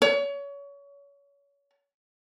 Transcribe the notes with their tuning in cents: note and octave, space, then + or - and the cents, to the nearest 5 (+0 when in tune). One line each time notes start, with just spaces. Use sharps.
C#5 +30